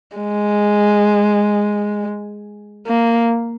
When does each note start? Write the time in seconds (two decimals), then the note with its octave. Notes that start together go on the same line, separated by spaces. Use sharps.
0.17 G#3
2.87 A#3